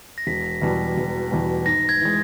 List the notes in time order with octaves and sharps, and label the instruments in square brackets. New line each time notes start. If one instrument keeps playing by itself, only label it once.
[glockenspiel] A#6
[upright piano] E1 [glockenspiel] B6
[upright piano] E2 B2 G3
E1
E2 B2 G3
[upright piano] G#2 [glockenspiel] A#6
[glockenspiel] G#6
[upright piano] E3 G#3